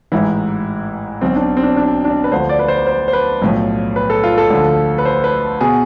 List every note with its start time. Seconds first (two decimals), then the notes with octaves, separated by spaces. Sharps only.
0.12 A1 G#2 E3 E4
1.21 B1 B2 C4
1.36 D4
1.57 C4
1.63 D4
1.77 D4
2.05 D4
2.24 B4
2.32 D2 D3 F3 C5
2.49 D5
2.59 B4
2.68 C5
2.87 C5
3.08 C5
3.13 B4
3.42 B1 A2 F3
3.96 B4
4.10 A4
4.24 F4
4.38 A4
4.50 D2 D3 F3
4.98 B4
5.05 C5
5.24 B4
5.61 B2 G#4